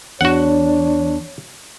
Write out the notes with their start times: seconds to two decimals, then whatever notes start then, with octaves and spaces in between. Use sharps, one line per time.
0.21 E2 D4 F#4 C#5 F#5